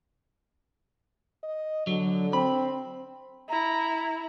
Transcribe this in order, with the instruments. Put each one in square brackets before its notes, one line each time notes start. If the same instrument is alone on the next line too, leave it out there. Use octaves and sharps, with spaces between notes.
[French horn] D#5
[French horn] D3 [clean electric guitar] F#3
[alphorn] C4 [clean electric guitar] B5
[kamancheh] E4 [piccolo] A#5